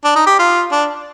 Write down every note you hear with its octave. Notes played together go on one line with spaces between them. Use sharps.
D4
D#4
G4
F4
D4